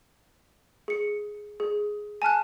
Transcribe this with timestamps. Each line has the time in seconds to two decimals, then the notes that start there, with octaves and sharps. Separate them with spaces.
0.88 G#4 C#7
1.60 G#4
2.22 G#5 A5 F6 F#6